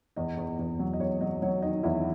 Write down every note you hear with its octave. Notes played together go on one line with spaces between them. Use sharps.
E2 D#5
E2
E2
F#3
D#5
E2 C#5
F#3 D#5
F#3 C#5
D#3 D#5
E2 E4 E5